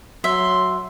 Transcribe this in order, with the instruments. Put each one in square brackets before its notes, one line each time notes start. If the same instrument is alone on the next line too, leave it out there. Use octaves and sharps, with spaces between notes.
[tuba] F#3 [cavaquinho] E5 [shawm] C6